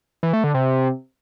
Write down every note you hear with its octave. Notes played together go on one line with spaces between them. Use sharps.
E3
A3
D3
C3